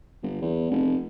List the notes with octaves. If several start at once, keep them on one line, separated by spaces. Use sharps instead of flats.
G1
E2
F1